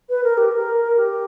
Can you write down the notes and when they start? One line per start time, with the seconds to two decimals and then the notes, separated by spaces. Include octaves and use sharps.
0.09 B4
0.24 A#4
0.37 G4
0.51 A#4
0.97 G4